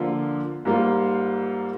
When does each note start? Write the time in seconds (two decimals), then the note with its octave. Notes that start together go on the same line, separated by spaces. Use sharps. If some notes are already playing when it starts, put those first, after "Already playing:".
Already playing: D3 F3 A#3 F4
0.65 G#2 G3 A#3 F4